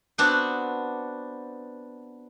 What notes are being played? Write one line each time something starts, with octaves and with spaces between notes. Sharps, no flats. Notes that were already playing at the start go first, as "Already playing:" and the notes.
B3 C4 D4 F#4